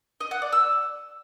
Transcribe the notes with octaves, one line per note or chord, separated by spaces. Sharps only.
D#5
F#5
D5
E6